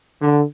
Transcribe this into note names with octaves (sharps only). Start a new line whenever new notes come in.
D3